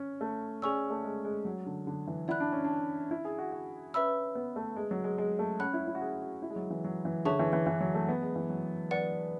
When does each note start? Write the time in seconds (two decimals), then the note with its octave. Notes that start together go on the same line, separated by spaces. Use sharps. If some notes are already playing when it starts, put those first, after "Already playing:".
Already playing: C#4
0.21 A3
0.62 C#4 G#4 D5 G#5 C#6 E6
0.90 A3
1.04 G#3
1.25 G#3
1.45 F#3
1.66 D3
1.87 D3
2.07 E3
2.28 E4 D5 F#5 B5 F#6
2.40 D4
2.52 C#4
2.64 D4
3.11 E4
3.25 G#4
3.38 F#4
3.52 F#4
3.94 C#4 B4 E5 B5 E6
4.35 B3
4.56 A3
4.76 G#3
4.91 F#3
5.04 G#3
5.18 G#3
5.39 A3
5.59 C#4 F#5 B5 F#6
5.74 E4
5.87 E4
5.95 F#4
6.01 G#4
6.22 F#4
6.42 E4
6.50 G#3
6.56 F#3
6.70 E3
6.84 F#3
7.05 E3
7.25 D3 G#4 C#5 E5 A5 C#6
7.39 E3
7.53 E3
7.66 E3
7.80 F#3
7.94 A3
8.09 B3
8.22 G#3
8.36 E3
8.50 F#3
8.91 B4 D5 F#5